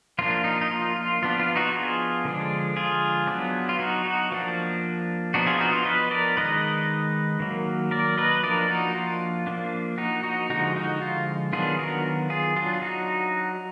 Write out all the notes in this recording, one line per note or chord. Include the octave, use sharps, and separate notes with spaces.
F3 A#3 D4 F4
D#4
D#4
F4
F4
F3 B3 D4 F4
F4
D#4 F#4
F4 G#4
D3 F3 G#3 D4
F4 G#4
F#3 B3 D4
F4
D#4 F#4
D#4 F#4
F3 A#3 D4
F3 B3 D4 D#4 F#4
F4 G#4
D#4 F#4
F4
B4 D#5
A#4 D5
D#3 G#3 D#4 B4 D#5
D#3 F#3 A#3
A#4 D5
B4 D#5
F3 A#3 D4 A#4 D5
D#4 F#4
F4
F3 A#3 D4
D#4 F#4
D#4 F#4
D3 F3 G#3 D#4 F#4
D#4 F#4
F4
D#3 F#3 B3 D4 F4 G#4
F#4 A#4
F4 G#4
F#3 D4 F4
D#4 F#4